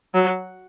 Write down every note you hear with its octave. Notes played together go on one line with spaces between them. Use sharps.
F#3